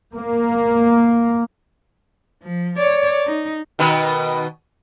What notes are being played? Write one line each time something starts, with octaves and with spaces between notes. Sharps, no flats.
A#3
F3
C#5 D5
D#4
B2 D#3 B4